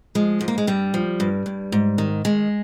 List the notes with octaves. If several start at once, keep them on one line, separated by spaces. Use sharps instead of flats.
F3 G#3
G#2
A#3
G#3
G2 G3
F3
G2
G2
G#2
D#3
D#3 G#3